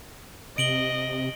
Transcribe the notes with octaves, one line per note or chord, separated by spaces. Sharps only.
C3 D#5 D7 F#7 G7